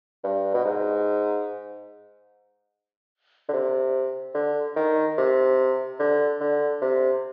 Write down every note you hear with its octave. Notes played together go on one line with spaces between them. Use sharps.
G2
B2
G#2
D3
C3
D3
D#3
C3
D3
D3
C3